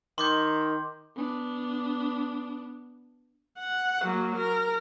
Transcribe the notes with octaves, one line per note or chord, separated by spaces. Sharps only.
D#3 C6 D6 G6
B3 D4
F#5
F#3 A#3
A#4